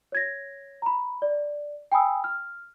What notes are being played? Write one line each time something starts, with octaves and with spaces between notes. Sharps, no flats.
C#5 G#6 A#6
A#5 B5
D5
G5 G#5 B5 D#6 E6
F6